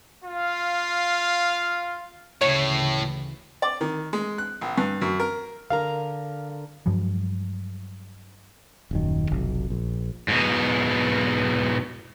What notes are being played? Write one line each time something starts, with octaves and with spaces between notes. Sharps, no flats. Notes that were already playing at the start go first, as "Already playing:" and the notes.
F4 F5
D2 A2 C#3 E3 C#5
D5
D#3
G#3
F#6
A#1
G2
F#2
A#4
D3 A#4 F5 A#5
G2 F3 F#3 G#3
D#1 F#2 D#3
F1 B1
A#1
G#2 B2